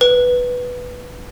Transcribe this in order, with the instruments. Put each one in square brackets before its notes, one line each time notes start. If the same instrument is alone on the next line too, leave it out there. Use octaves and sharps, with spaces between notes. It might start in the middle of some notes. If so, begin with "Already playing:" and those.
[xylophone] B4